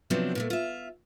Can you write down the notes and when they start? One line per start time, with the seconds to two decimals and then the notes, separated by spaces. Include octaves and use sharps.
0.10 C3 F3 F#3 B3 C4 D4
0.35 A#2 G#3 A3
0.50 F4 E5